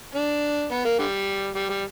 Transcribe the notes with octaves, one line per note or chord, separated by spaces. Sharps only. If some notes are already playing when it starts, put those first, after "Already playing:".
D4
B3
A#3
D3 G3
G3
G3